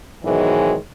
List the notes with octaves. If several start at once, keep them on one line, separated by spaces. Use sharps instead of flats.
G#2 B2 D#3 E3 F#3 G#3